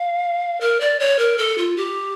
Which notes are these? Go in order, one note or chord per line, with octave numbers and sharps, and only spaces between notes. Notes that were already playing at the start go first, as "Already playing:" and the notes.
Already playing: F5
A#4
D5
C#5
A#4
A4
F4
G4